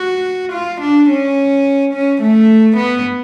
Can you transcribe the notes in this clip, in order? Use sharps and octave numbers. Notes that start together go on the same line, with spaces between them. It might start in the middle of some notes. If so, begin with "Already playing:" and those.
Already playing: F#4
F4
D4
C#4
C#4
A3
B3